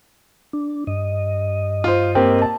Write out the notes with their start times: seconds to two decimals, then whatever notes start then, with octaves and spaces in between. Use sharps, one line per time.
0.53 D4
0.87 G2 D#5
1.84 F4 C5
2.15 A#3 C4 G4
2.42 A5